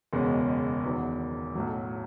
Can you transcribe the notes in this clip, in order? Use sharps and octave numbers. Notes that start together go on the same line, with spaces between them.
F#1 E2 B2 G#3 C#4
E2 D#3 F#3 B3
B1 A2 F#3